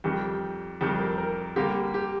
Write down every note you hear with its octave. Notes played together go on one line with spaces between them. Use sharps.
F2 D#3 G3 G4
F2 D#3 G3 G4
A#4
A#4
D3 G3 A#3 G4
G4